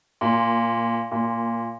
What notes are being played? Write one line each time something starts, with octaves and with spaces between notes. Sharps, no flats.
A#2
A#2